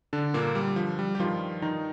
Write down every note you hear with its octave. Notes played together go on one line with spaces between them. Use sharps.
D3 D4
G2 A#2 D3 A#3
G3
F3
G3
G4
G2 D#3 F3 F4
D#3 D#4